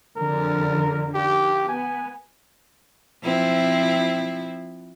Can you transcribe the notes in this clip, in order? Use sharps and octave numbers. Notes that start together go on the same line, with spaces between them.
F2 D3 A#4
G4
B3 G#5
F3 C4 E4